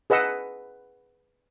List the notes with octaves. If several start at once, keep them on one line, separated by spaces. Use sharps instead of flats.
G#4 B4 D#5 F#5 E6